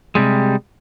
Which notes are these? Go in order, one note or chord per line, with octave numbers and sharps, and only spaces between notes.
C3 G3 G#3